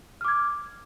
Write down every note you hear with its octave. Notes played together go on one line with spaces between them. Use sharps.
D6 F6 G#6